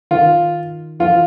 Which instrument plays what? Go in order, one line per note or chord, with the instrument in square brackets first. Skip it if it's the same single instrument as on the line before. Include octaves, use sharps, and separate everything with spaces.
[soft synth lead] D#3 [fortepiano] F4
[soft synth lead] F3 [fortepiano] F4
[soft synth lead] E3